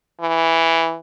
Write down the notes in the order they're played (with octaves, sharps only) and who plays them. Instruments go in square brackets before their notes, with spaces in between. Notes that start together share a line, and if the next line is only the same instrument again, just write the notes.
[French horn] E3